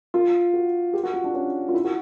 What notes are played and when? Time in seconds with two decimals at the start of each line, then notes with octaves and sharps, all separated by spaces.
0.14 F4
0.53 F#4
0.93 G4
1.04 F#4
1.14 F4
1.24 D4
1.34 C#4
1.69 F4
1.74 E4
1.84 F#4